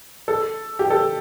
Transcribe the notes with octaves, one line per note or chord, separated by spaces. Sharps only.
A4
G4
A4